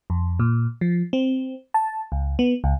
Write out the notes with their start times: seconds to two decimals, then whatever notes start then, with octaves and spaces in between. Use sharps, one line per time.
0.10 F2
0.40 A#2
0.81 F3
1.13 C4
1.74 A5
2.12 C#2
2.39 B3
2.64 C#2